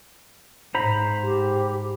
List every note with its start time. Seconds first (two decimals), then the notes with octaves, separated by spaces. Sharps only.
0.75 G#2 C5 A#5 B5
1.24 G4